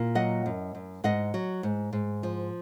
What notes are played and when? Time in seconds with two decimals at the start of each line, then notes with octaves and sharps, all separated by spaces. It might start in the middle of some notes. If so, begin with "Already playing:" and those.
Already playing: A#2
0.15 F#3 D#5 F#5
0.46 F#2
0.75 F#2
1.04 G#2 D#5 F#5
1.34 F#3
1.63 G#2
1.93 G#2
2.23 F3